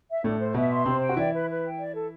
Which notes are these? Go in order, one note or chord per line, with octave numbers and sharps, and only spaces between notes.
E5
A2 A3 D4
C5
B2 B3 E5
C6
C3 C4 C5
G5
F#4
E3 E4 D5
B4
B4
G5
D5
A4